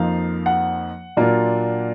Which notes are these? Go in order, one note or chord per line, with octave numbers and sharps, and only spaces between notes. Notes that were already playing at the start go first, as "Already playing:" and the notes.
Already playing: F2 F3 A#3 D#4 F5
F#5
A#2 F#3 A#3 D4 F4